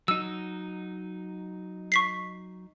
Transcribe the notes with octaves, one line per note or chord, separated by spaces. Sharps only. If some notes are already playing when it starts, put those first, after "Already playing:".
F#3 D#4 E6
C#6 B6 C7